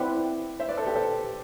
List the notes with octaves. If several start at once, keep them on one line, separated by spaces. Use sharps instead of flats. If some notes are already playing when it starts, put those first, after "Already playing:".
Already playing: C4 E4 B4 D5 E5 F#5 G5
C5 E5
B4 D5
A4 C5
G4 B4
A4 C5